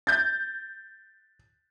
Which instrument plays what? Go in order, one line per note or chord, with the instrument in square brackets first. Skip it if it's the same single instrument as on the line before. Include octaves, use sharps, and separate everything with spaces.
[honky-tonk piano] G6 A6